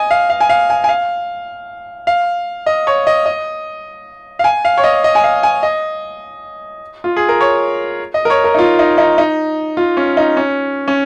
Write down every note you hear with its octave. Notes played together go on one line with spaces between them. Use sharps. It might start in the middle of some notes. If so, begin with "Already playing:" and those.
Already playing: D#5 G#5
F5
F5
G#5
F5
G#5
G#5
F5
F5
D#5
C#5
D#5
D#5
F5
G#5
F5
C#5
D#5
D#5
G#5
F5
G#5
D#5
F4
G#4
A#4
C#5
D#5
A#4
C#5
A#4
D#4
F4
D#4
D#4
D#4
F4
C#4
D#4
C#4
C#4